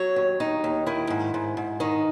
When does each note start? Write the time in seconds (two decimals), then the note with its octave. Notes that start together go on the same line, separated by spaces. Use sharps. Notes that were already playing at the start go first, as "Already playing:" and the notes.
Already playing: F#3 C#5
0.16 D#2
0.40 D#2 D#4
0.64 D#2
0.87 D#3 E4
1.10 G#2
1.34 G#2
1.57 G#2
1.80 D#3 D#4